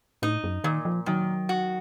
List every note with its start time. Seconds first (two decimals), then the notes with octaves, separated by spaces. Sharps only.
0.22 A2 D#4
0.44 F#2
0.64 A#2 D#3
0.85 F3
1.06 D#3 F#3
1.49 F#4